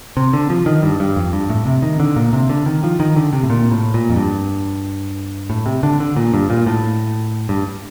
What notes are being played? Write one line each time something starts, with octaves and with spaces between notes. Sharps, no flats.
C3
D3
F3
D#3
G2
G2
F2
G2
A2
C3
D#3
D3
A#2
C3
D3
D#3
F3
D#3
D3
C3
A2
A#2
A2
A#2
F2
G2
A2
C3
D3
D3
A#2
G2
A#2
A2
G2